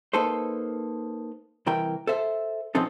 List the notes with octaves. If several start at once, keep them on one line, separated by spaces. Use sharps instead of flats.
A#3 D#4 A4 B4 C5
C2 E3 A#4 G5
A4 C5 E5
B2 F3 C4 C#4 D#4 A4